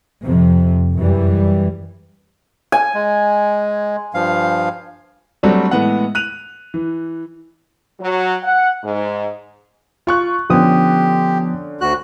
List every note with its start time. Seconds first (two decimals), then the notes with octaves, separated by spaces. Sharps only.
0.24 F2 C3
0.94 F#2 E3 G3
2.72 G#5
2.94 G#3
4.14 G2 F3 F5
5.43 F#3 G3 A3 C4 D4 F#4
5.71 A2 E3 G#3 B3 F#5
6.15 F#6 D#7 F7
6.74 E3
8.00 F#3
8.43 F#5
8.84 G#2
10.07 F4 C#6 F#6
10.50 D3 F3 B3 C#4 G4 D#6
11.81 D2 F#4 F#6